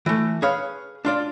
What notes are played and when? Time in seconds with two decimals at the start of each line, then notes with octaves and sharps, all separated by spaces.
0.06 E3 A3
0.42 G#4 B4 C#5 F5
1.05 D4 F4 D5